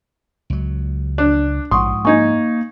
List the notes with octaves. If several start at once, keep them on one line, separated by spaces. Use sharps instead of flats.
C#2 F#3
D4 F#6
A#1 G#2 F3 F#5 C6 C#6 D#6
A#3 D#4 G#5 C#6 G#6